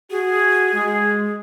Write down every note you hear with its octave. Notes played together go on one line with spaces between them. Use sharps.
F#4 G#4
G#3